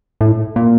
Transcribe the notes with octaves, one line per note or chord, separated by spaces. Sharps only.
A2
A#2